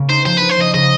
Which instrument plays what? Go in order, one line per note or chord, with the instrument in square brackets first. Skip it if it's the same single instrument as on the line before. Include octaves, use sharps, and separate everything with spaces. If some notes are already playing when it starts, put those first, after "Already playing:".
Already playing: [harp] C#3 A#3
[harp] D#4 [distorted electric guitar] C5
[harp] F3 [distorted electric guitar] C5
[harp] D#4 [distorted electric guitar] B4
[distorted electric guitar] C5
[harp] F3 [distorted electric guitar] D#5
[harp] C#3 [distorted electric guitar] D#5